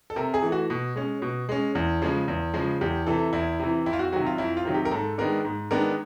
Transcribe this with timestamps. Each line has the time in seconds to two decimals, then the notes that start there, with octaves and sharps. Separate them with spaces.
0.10 A4
0.16 C3 A#4
0.34 G#4
0.42 E3 A3
0.52 F#4
0.70 B2
0.96 G#3 C#4
1.22 B2
1.49 G#3 C#4
1.75 E2
2.02 C#3 F3 G#3
2.28 E2
2.54 C#3 F3 G#3
2.81 E2 G4
3.07 C3 E3 A4
3.33 E2 E4
3.59 C3 E3
3.86 F2 E4
3.93 F4
3.99 F#4
4.12 C3 D#3 F#3 F#4
4.26 F4
4.38 F2 E4
4.57 F4
4.65 C3 D#3 F#3
4.74 G4
4.85 A#4
4.91 G#2 A4
5.18 D#3 G#3 B3 D4 A#4
5.45 G#2
5.71 D#3 G#3 B3 D4 A#4